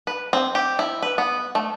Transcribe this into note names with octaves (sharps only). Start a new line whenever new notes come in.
B4
C4
G4
E4
B4
B3
A3